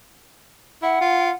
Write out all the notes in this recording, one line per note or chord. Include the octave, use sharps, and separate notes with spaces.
E4 F#5
F4